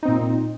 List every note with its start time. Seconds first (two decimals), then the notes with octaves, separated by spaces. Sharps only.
0.03 D#4
0.05 C4
0.08 A#2